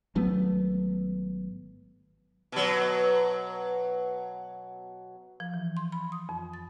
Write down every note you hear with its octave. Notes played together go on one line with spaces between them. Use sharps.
G#1 F#3 A3 B3
B2 F#3
F3
E3
C6
B5
D#6
F2
A6